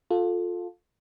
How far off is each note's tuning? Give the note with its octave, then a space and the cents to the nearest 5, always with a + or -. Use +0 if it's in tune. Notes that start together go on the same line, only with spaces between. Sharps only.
F4 +20 A4 +0